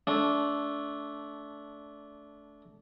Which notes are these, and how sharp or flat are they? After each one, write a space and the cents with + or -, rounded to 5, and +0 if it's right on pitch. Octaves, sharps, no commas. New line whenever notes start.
A3 -5 D4 -20